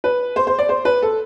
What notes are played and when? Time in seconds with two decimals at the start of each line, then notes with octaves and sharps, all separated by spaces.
0.04 B4
0.36 C5
0.47 C5
0.58 D5
0.69 C5
0.85 B4
1.02 A4